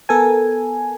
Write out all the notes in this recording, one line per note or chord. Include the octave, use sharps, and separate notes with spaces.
B3 A4 A#4 G#5